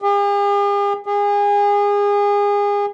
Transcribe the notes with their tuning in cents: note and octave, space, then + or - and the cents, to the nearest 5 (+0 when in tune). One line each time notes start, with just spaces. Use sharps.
G#4 -45
G#4 -30